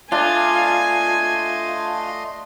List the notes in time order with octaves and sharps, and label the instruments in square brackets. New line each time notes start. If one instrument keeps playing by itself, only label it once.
[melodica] A3 D#5 C6 [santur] D4 [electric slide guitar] F4 [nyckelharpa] G#5